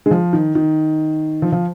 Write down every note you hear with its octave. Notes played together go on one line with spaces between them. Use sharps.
G#3
F3
D#3
D#3
F3
F3